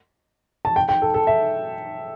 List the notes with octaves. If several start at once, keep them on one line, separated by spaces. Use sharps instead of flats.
A5
G5
G5
A4
A4
E5